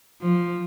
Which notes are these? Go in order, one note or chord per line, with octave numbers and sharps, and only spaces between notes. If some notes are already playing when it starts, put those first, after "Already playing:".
F3